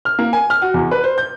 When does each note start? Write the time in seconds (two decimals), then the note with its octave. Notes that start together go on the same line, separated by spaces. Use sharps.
0.05 F6
0.19 A#3
0.33 G#5
0.50 F6
0.62 F#4
0.74 E2
0.91 B4
1.04 C5
1.18 G6